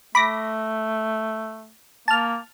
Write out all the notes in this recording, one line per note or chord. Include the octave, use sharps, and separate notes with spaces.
A3 B5 D6 A#6
A#3 A5 F6